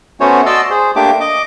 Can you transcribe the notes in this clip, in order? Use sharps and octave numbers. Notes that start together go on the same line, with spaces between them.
A3 B3 C#4 F#4 C5 C#5
F#4 D5 D#5 A5 C6 E6
G#4 C5
A3 A#3 D4 G4 D6
D#5 D6